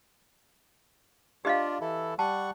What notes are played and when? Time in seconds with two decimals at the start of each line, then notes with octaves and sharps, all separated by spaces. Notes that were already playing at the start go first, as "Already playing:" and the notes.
1.45 D4 F4 G4 D#5 F5
1.81 E3 E4 A4
2.19 G3 F#5 A5 C#6